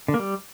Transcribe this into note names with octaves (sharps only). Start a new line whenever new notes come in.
D3
A#3
G3